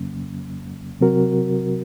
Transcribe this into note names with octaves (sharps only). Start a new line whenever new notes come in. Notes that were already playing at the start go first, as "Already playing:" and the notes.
Already playing: F2 C#3 F#3 A#3 C#4
C3 F#3 C4 F#4 A#4